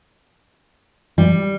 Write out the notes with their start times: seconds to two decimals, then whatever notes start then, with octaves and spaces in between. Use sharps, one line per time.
1.18 G3